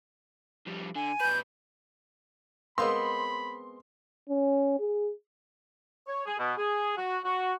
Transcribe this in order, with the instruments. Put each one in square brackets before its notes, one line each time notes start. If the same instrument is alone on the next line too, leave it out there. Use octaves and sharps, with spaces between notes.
[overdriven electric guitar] F2 G3
[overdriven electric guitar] D3 [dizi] G#5
[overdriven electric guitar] A#2 B4 [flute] G6
[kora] G#3 B3 C4 [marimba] A#4 F5 E6 [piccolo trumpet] B5 [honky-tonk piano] C6
[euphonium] C#4
G#4
[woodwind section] C#5
G#4
B2
G#4
F#4
F#4